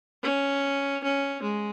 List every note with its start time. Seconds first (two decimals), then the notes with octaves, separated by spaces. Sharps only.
0.23 C#4
1.03 C#4
1.42 G#3